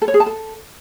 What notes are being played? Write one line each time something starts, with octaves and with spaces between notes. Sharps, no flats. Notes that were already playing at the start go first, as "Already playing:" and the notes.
A4
C#5
G#4
A5
A4